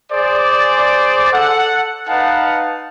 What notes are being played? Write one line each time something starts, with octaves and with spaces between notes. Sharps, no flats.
G#4 C5 D5
A4 F#5
D#4 B4 F5 F#5 A5